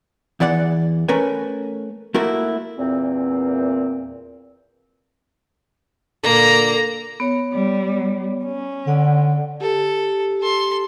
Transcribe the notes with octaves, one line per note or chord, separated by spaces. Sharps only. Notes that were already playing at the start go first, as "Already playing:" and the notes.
E2 E3 D5 F#5
A3 C#4 A#4 B4 G#5
A3 A#3 E4 F#4 A#4
E2 A#2 C4
A#2 D3 A#3 A4 A#5
B3 C#5
G3
C#4
D3 D5 F#5
G4 A4
A4 C6